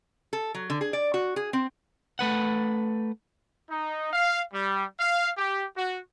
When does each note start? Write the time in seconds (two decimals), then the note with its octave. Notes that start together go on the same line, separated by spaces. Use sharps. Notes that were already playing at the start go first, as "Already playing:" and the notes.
0.33 A4
0.55 F#3
0.70 D3
0.81 G#4
0.93 D5
1.14 F#4
1.36 G#4
1.53 C4
2.19 A3 B4 F#5
3.71 D#4
4.13 F5
4.53 G3
4.99 F5
5.37 G4
5.77 F#4